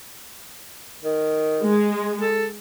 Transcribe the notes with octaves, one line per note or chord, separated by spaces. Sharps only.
D#3
G#3
A4